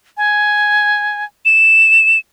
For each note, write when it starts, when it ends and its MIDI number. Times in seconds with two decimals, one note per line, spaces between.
0.17 1.25 80
1.45 2.19 100